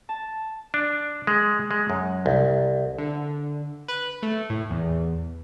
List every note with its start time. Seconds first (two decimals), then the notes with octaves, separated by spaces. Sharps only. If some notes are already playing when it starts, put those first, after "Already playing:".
0.09 A5
0.74 D4
1.27 G#3
1.71 G#3
1.90 F#2
2.26 C2
2.98 D3
3.88 B4
4.23 A3
4.50 A2
4.71 E2